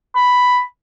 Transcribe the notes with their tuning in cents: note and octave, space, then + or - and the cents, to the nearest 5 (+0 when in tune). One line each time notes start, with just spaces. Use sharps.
B5 +5